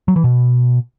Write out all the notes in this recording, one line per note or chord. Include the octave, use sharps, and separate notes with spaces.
F#3
E3
B2